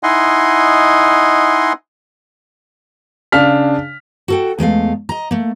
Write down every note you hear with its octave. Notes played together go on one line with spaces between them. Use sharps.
D#4 E4 D#5 F#5 G#5 C6
C#3 D4 F5 F6 B6
F#4 A4 G5
E2 G#3 A3 F5
D#5 A#5
A3 A#3